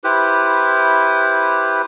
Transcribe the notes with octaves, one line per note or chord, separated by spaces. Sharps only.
E4 G4 B4 C5